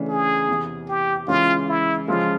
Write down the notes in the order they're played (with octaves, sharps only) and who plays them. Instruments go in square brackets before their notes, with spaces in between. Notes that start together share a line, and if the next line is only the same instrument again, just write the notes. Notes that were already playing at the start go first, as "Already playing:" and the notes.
Already playing: [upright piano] C#3 E3 A3 D4
[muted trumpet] G#4
[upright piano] E2 C3 E3
[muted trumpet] G4
[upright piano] C#3 E3 G#3 C#4 [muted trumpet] F4
[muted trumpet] E4
[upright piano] C#3 F3 G#3 [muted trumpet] F4